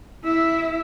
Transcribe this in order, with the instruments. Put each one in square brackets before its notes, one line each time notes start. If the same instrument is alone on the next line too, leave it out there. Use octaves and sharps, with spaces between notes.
[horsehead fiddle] E4 E5